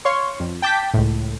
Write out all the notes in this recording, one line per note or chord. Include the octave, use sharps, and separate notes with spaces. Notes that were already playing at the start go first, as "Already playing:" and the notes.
C#5 F5 C6 C#6
F2
G5 A5 D6 G6 B6
C#2 A2